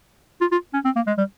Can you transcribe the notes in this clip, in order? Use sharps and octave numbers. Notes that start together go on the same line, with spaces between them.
F4
F4
C#4
C4
A#3
G#3
G3